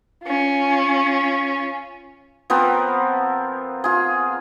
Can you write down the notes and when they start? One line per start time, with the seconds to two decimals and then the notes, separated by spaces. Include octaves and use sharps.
0.24 C#4 F4
2.50 F3 B3 C4 A#4
3.84 F4 G#4